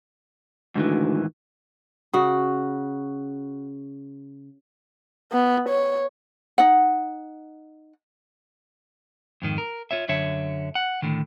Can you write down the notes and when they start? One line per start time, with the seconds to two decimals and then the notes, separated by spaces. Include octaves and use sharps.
0.75 D2 G#2 D#3 E3
2.13 C#3 F#4
5.32 B3
5.69 C#5
6.58 D#4 F#5
9.42 F2 G#2 D#3
9.58 A#4
9.91 F4 C#5 E5
10.08 F#2 D3 C#5 E5
10.75 F#5
11.02 A2 D3 D#3